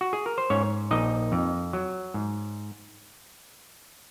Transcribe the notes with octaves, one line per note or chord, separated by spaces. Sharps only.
F#4
G#4
A#4
C5
G#2 C#4 C#5
A#1 D#4 D#5
F2
F#3
G#2